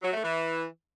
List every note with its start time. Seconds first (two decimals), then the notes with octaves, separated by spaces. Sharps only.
0.02 F#3
0.13 A3
0.23 E3